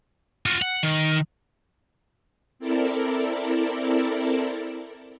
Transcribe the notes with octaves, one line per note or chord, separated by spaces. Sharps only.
F4 F#4
F#5
D#3
C4 E4 A4 A#4 D5